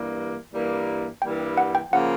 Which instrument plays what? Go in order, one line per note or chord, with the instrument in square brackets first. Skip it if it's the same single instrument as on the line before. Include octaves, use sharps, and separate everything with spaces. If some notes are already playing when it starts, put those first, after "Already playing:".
Already playing: [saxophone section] G2 E3 G3 A#3
G2 E3 G3 A#3
[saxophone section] G2 E3 G3 A#3 [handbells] G5
[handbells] F#5
G5
[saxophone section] C#3 F3 A#3 [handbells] F#5